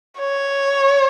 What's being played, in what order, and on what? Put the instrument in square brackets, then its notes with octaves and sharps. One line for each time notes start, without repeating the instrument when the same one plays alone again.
[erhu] C#5